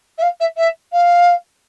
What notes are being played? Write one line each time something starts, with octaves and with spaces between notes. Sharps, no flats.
E5
F5
E5
E5
F5